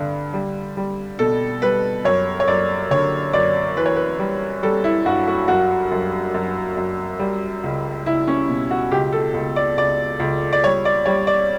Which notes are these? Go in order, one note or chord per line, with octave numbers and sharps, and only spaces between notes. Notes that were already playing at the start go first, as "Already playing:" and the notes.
Already playing: G2 D3
G3
G3
B2 A4
G3 B4
F#2 C#5
C#5
F#2 D5
D3 C#5
F#2 D5
E3 B4
C#5
B4
G3
G3 A4
E4
G2 F#4
F#4
F#2 F#4
F#2
F#2
F#2
G3
C#2
C#2 E4
C#4
B2
F#4
C#2 G4
A4
C#2
D5
C#2 D5
C#2
D5
G3 C#5
D5
G3 C#5
D5